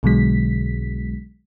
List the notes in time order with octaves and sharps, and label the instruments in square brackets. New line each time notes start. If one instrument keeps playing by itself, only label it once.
[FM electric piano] B1 B2 D3 F#3 G#3 B6